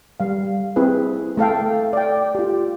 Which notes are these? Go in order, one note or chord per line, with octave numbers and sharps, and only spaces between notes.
G3 F5
C4 E4 G#4 B4
A3 A4 F5 G5
D5 G5
F4 G4